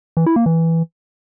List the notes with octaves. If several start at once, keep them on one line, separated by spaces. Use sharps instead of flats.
E3
E4
A#3
E3